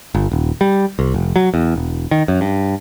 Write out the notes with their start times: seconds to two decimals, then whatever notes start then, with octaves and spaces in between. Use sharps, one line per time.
0.15 G1
0.31 D#1
0.61 G3
0.99 C2
1.14 F1
1.36 F#3
1.54 E2
1.76 E1
2.11 D#3
2.28 F#2
2.41 G2